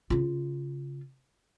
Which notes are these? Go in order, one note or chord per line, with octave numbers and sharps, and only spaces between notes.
C#3 F4